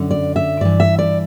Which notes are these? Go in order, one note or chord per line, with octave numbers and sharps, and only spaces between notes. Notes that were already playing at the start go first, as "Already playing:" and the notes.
Already playing: F#2 D3
D5
E5
G2 E3 D5
E5
D5